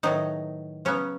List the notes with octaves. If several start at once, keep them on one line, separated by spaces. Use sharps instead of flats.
A2 D#3 F#3 B3 D#4
C#3 F#3 B3 C#4